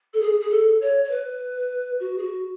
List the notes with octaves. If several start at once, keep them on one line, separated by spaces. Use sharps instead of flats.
A4
G#4
G#4
A4
C#5
C#5
B4
F#4
G#4
F#4